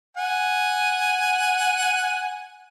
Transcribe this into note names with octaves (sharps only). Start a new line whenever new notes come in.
F#5 G#5